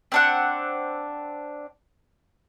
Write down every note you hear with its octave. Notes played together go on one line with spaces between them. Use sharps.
C4 D4 F#5